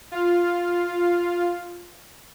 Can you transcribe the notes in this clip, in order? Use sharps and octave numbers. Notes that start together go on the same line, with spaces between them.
F4 F5